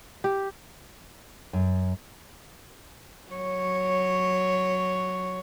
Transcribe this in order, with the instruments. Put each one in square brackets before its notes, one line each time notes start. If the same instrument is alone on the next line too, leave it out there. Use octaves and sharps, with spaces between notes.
[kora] G4
[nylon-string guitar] F#2
[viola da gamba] F#3 C#5